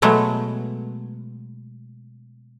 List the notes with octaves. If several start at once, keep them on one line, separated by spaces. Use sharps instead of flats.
B2 F#3 G#3 A3 B3